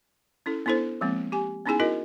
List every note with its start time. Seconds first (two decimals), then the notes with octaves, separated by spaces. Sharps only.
0.46 C#4 E4 A4
0.66 B3 D4 E4 A4 C5
1.01 F3 G#3 A#3 C4
1.32 G4 G#5
1.66 B3 C#4 D#4 E4 G#4 G#5
1.80 E4 F#4 A#4 D#5